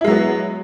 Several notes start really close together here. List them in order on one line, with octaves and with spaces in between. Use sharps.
E4 G#3 F#3 B3